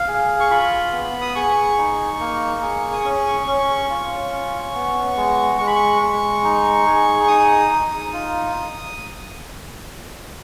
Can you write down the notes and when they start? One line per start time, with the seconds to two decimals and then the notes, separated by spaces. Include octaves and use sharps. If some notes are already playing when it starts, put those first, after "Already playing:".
Already playing: F5
0.08 G#4
0.40 C#6
0.50 F4 B5
0.93 B3
1.21 D#6
1.35 G#4 C#6
1.78 D#4
2.20 A#3
2.62 G#4
2.93 D#6
3.04 C#4 C#6
3.47 C#4 C#6
3.90 F4
4.32 C#4
4.74 B3
5.17 G#3
5.59 G#3 C#6
5.67 B5
5.75 C#6
6.02 G#3
6.44 D#4
6.87 G#4
7.23 C#6
7.28 D#4 D#6
7.71 D#4
8.13 F4